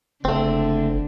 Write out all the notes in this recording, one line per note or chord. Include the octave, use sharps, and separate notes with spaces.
F#1 D3 A3 C4 D4